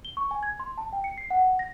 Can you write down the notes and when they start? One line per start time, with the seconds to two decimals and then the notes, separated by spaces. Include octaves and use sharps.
0.05 G7
0.17 C#6
0.31 G#5
0.43 G#6
0.60 C6
0.78 A5
0.93 G5
1.04 C#7
1.18 C7
1.30 F#5
1.59 A#6